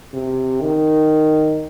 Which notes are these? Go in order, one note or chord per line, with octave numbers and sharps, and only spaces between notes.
C3
D#3